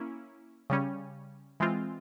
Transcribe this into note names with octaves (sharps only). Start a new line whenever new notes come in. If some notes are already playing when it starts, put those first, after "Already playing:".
Already playing: A#3 C#4 E4
C#3 G3 C#4
E3 G#3 C4 F4